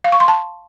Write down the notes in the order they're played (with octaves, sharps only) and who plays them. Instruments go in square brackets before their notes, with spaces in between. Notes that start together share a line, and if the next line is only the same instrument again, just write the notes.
[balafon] F5
C#6
C6
A5